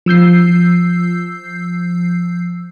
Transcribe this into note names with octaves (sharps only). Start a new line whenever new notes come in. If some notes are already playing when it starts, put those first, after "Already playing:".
F3 E6 G6 C7